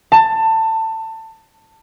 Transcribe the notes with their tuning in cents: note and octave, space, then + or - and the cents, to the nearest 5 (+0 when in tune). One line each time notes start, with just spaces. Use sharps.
A5 +20